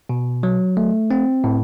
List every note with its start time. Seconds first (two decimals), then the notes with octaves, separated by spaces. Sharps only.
0.09 B2
0.43 F#3
0.77 A3
1.11 C4
1.44 A2